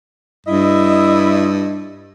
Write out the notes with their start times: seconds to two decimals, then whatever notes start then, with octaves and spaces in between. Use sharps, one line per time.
0.47 G2 E4 D#5